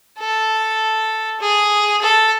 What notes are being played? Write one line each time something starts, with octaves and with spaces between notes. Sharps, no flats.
A4
G#4
A4